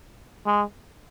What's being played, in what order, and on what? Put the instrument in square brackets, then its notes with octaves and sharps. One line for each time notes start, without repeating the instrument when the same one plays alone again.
[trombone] G#3